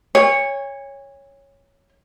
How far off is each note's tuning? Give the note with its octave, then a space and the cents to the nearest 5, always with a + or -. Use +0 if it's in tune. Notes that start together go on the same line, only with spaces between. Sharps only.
C#5 +0 G#5 -40